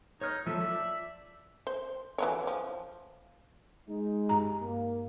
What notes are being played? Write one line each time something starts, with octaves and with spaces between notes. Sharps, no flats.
D#4 C#5 F6 G6
F3 A3 E5
D5
C5
E3 F#3 C#5
F3
G#3 D#4
G2 A#5
A#3